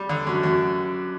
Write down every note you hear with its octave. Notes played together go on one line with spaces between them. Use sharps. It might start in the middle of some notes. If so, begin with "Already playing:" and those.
Already playing: G3
D3
F#2
F#2